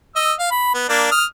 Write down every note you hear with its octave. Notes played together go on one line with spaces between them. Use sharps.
D#5 E6
F5
B5
B3
A#3 D4
D#6 F6